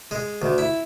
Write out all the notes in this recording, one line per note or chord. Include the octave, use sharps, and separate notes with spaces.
G#3
D2
E4